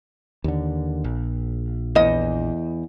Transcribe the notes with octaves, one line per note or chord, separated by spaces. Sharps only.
D#2 D3
A#1
E2 D#5